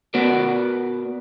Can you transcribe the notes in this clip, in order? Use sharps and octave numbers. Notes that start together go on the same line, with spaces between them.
B3 F#4 A#4 B4 D5